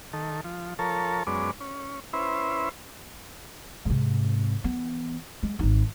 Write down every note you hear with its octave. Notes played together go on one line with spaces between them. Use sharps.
D#3 A4
F3
F3 A4 A#4 C#5 A5
F#2 G#3 B3 C#4 D5 D6
C#4
C#4 E4 B4 C5 E5
G#2 C3
E3 B3
G#3
G#1 D#4